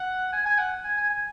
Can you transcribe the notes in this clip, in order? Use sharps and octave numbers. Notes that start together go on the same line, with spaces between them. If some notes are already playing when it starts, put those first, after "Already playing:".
Already playing: F#5
G#5
G#5
F#5
G#5
G#5
G#5